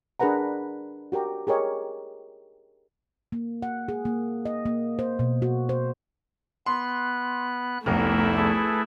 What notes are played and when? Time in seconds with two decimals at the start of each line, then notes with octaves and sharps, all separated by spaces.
0.20 D4 G#4 A#4 B4 F#5 A#5
1.12 F#4 G4 A#4 A#5
1.47 G4 G#4 A#4 C#5 D#5
3.32 A#3
3.62 F#5
3.88 G#4
4.05 A#3
4.45 D#5
4.66 A#3
4.99 C5
5.19 B2
5.42 F#4
5.69 C5
6.66 B3 C6 F#6
7.86 F1 C2 A3 B3 E4 A#4
8.37 G#4 A4 B4